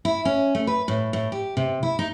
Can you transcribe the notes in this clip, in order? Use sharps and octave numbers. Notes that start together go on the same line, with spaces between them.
E4
C#4
A3
B4
A2
A2
G4
C3
E4
D#4